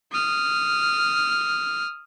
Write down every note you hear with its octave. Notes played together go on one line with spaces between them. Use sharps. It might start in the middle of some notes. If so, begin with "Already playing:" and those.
D#6 F6